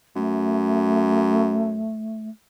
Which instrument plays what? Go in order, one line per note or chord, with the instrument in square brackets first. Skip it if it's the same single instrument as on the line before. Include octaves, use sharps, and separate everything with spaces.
[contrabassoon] F#2 [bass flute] A3